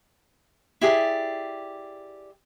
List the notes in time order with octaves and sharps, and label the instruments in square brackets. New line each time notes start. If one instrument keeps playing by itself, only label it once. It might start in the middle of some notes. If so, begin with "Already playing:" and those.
[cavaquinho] E4 G4 G#4 D5